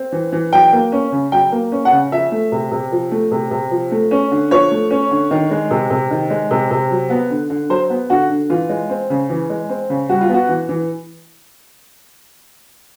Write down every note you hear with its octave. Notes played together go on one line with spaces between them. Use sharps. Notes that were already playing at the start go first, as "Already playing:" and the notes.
Already playing: C4
E3
E3
F#3 G5
A#3
C#4
C#3
F#3 G5
A#3
C#4
F#5
C#3
F3 E5
A3
C3
C3
F3
A3
C3
C3
F3
A3
C#4
D3
F3 C#5
A3
C#4
D3
D#3
G#3
C3
C3
D#3
G#3
C3
C3
F#3
B3
D3
D3
F#3 C5
B3
D3 F#4
D3
E3 F4
G#3
C4
C#3
E3
G#3
C4
C#3
G3 F#4
F4
B3
F#4
E3
E3